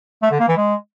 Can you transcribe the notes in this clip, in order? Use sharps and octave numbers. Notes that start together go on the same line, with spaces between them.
A3
D3
A#3
E3
G#3